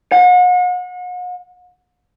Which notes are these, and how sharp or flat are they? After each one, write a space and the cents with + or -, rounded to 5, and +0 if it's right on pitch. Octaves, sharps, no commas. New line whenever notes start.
F#5 -40